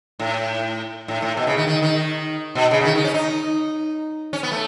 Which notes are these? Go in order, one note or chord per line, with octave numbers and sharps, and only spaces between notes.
A2
A2
A2
B2
C#3
D#3
D#3
D#3
B2
C#3
C#3
D#3
D#3
C#4
D#4
C#4
B3
A3